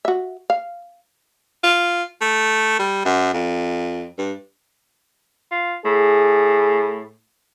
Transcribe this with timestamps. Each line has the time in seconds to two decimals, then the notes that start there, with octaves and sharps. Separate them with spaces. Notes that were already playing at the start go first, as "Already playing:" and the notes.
0.05 F#4 E5
0.50 F5
1.63 F4
2.21 A3
2.79 G3
3.05 F#2
3.33 F2
4.18 G2
5.52 F4
5.85 A2 G#4